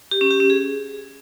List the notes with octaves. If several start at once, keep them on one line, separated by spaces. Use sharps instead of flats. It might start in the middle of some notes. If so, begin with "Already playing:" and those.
G4
C#4
G4
C#4
G#4